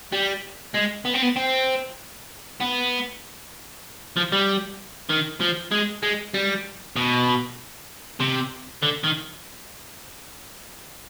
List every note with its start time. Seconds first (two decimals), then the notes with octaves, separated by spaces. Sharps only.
0.13 G3
0.75 G#3
1.06 B3
1.15 C4
1.23 B3
1.37 C4
2.61 B3
4.17 F3
4.32 G3
5.09 D#3
5.41 F3
5.72 G#3
6.03 G#3
6.34 G3
6.96 B2
8.20 C3
8.83 D3
9.04 D#3